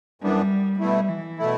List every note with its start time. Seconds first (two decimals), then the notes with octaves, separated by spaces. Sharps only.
0.22 F#2 E3 G3 B3 D4
0.79 B2 G3 A3 E4
1.09 E3
1.39 B2 A3 E4